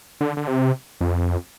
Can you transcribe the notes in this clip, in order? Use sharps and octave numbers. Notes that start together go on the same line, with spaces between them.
D3
D3
C3
F2